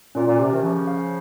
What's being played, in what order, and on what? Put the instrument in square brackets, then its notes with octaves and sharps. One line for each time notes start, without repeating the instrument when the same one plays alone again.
[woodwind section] A#2 [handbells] C#4
[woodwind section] A#2
[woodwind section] C3 [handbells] G4
[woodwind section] C3 D#3
[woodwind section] C#3 F3 [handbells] C#4
[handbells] F5